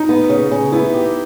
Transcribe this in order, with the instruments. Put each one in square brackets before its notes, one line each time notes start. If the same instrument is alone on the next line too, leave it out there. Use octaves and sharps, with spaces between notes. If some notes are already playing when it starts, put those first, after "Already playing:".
Already playing: [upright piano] D#4
[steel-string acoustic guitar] B3
C#3
C#3
[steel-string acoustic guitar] B3 [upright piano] E4
[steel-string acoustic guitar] G4